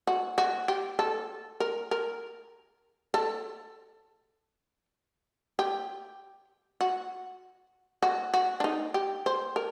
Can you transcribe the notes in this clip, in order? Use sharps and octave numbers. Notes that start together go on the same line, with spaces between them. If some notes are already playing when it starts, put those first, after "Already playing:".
F#4
F#4
G4
A4
A#4
A#4
A4
G4
F#4
F#4
F#4
D4
D#4
G4
C5
A#4